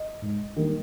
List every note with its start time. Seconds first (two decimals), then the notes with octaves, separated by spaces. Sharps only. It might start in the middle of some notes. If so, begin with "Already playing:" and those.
Already playing: D#5
0.22 G#2
0.56 D#3 G3 A#3